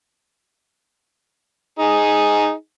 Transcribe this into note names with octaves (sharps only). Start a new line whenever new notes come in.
D#4 G#4